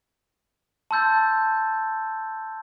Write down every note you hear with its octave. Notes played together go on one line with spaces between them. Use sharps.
A5 C6 E6 G6 A6